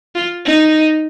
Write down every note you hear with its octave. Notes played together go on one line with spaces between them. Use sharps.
F4
D#4